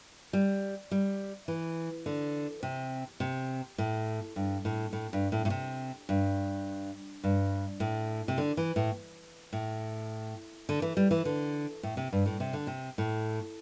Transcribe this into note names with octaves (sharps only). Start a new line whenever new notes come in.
G3
G3
E3
D3
C3
C3
A2
G2
A2
A2
G2
A2
A2
C3
G2
G2
A2
C3
D3
E3
A2
A2
D3
E3
G3
E3
D3
A2
C3
G2
A2
C3
D3
C3
A2